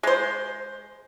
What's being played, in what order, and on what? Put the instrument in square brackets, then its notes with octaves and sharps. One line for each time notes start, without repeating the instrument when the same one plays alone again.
[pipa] G#3 C5